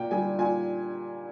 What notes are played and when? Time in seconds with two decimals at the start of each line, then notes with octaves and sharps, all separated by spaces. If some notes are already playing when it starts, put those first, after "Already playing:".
Already playing: A#2 G5
0.11 G3 G#5
0.39 A#2 G#5